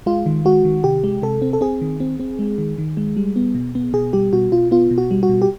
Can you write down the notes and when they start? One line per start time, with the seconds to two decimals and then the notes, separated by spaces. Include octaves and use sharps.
0.06 G#3 F4
0.26 D#3
0.45 G#3 F#4
0.65 D#3
0.84 C3 G4
1.04 G#3
1.22 C3 A4
1.42 C4
1.53 A4
1.61 C4 G#4
1.81 D#3
2.00 C4
2.20 C4
2.39 G#3
2.58 D#3
2.78 D#3
2.97 G#3
3.17 G3
3.36 B3
3.55 B2
3.75 B3
3.93 B2 G#4
4.13 G3 G4
4.33 B2 F#4
4.52 B2 F4
4.71 B3 F4
4.91 B2
4.98 F#4
5.11 G3
5.23 F#4
5.29 B2
5.42 G4